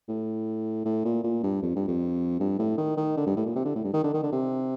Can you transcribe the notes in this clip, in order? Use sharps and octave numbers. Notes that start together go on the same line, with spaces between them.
A2
A2
A#2
A#2
G2
F2
G2
F2
G2
A2
D#3
D#3
D3
G2
A2
A#2
C3
D3
A2
G2
D#3
D3
D#3
D3
C3